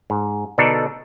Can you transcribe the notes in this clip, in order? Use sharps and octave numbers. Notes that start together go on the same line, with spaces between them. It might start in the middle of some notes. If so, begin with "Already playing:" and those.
G#2
B2 D3 D4 D#4 A4 A#4